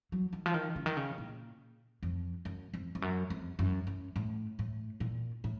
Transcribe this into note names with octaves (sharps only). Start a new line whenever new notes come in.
F#3
D#3
F3
D#3
C#3
D#3
C#3
A#2
F2
F#2
F2
F2
F#2
F2
F#2
F#2
A2
A2
A#2
A2